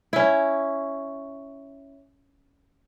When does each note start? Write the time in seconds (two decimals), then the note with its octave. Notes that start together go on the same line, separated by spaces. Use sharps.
0.13 C#4 E4